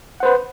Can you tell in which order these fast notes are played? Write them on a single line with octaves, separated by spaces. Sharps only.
F#5 C5 B4